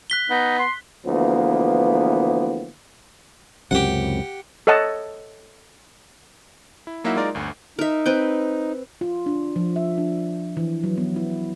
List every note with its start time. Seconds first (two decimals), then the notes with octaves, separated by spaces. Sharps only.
0.10 F#6 B6 G7
0.30 B3 D#4
0.59 C6
1.07 D2 E3 F3 A#3 B3
3.71 C#2 F#2 C3 G4 F#5
4.67 A4 C#5 D#5 F#5 A5
6.87 E4
7.04 F#3 A#3 D#4 E4 E5 F#5
7.16 G#3 D#4 F4 A#4 D5
7.35 G1 D2
7.79 D#4 A#4 E5
8.06 C4 B4 G5
9.01 F4
9.26 D4
9.56 F3
9.76 E5
9.98 D4
10.57 E3
10.84 F#3
10.98 B3
11.16 E4